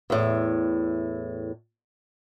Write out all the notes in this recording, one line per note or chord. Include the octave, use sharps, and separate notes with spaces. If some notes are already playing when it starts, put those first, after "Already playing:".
E2 A2